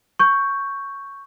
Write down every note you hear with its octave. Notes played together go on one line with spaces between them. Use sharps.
C#6 G6